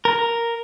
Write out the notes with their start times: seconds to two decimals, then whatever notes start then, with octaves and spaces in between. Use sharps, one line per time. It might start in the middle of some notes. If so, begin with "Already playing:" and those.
0.05 A#4